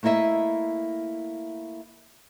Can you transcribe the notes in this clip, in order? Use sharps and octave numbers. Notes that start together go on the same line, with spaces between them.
A3 A#3 E4 D#5 E5